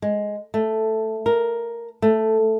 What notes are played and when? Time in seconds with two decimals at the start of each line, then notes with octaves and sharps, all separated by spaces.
0.02 G#3
0.54 A3
1.26 A#4
2.02 A3